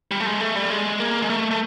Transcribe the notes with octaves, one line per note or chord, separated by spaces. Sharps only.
G3
A3
G#3
A3
G3
G#3
A#3
G#3
A3
A3